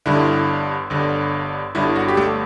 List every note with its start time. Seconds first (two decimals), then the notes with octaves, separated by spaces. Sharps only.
0.06 G1 G2 D3 E4
0.90 G1 G2 D3
1.75 G1 G2 D3 E4
1.96 F#4
2.08 G4
2.17 A3 A4